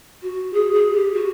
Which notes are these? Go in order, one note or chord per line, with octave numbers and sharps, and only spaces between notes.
F#4
G#4
G#4
G4
F#4